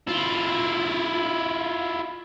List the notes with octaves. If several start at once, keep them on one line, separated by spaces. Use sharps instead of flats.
E4 F4